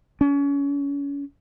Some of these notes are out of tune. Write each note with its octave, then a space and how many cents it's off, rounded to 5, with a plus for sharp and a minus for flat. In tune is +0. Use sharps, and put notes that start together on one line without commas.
C#4 +30